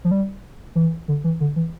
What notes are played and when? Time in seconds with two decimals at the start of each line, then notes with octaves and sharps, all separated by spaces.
0.04 F3
0.11 G3
0.75 E3
1.08 D3
1.24 E3
1.41 D3
1.56 E3